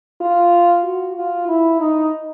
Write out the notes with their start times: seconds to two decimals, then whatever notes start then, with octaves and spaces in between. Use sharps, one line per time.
0.21 F4
0.84 F#4
1.16 F4
1.48 E4
1.80 D#4